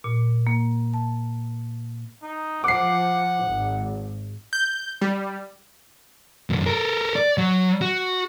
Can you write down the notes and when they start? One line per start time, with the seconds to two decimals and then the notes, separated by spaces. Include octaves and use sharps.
0.04 A#2
0.47 A#3
0.94 A5
2.23 D#4
2.64 F3 F#5 D6 C7
3.45 G#1
4.53 G6
5.02 G3
6.50 C2 F#2
6.66 A4 A#4
7.16 D5
7.38 F#3
7.82 F#4